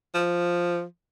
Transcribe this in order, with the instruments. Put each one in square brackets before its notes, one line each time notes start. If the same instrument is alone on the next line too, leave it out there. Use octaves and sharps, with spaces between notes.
[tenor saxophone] F3